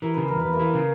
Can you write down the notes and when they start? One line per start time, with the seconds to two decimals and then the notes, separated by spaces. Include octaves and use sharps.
0.02 E3 A#4
0.14 C#3 B4
0.28 E2 A#4
0.40 B4
0.45 E2
0.53 A#3 A#4
0.60 E3
0.73 C#3